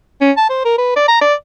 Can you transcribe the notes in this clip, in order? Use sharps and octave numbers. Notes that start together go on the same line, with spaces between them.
C#4
A5
C5
A#4
B4
D5
A#5
D5